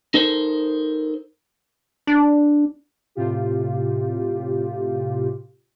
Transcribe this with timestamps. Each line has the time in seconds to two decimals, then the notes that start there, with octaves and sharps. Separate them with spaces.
0.14 D#4 A4 A#4 C5
2.07 D4
3.15 A2 C3 F4 G4